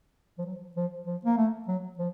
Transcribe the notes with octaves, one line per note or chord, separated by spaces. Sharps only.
F3
F#3
F3
F3
A#3
A3
F#3
F3